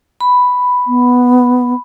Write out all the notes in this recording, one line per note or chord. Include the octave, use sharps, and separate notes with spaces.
B5
B3